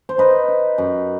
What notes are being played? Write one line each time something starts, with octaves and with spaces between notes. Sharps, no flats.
C5
D#4 B4 D#5
D#4
F#2